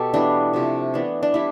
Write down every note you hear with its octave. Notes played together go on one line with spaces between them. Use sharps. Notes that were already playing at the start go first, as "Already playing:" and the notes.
Already playing: B2 G4 A4
E3 G3 B3 D4
C3 F3 A3
E3 B3 D4
D4
G3 B3 E4